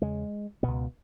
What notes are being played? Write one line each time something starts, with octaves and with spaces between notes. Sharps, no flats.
E2 C#3 G#3
C#2 B2 B3